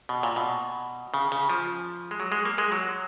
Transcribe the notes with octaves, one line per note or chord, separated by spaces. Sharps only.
B2
A#2
B2
C#3
C#3
F3
G#3
F#3
G#3
A#3
G#3
F#3